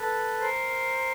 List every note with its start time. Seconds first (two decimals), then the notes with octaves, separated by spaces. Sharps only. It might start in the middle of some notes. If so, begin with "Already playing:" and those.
Already playing: A4 B4
0.40 A#4 C5